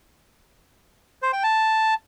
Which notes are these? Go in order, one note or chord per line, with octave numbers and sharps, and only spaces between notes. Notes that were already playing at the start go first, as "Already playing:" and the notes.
C5
G5
A5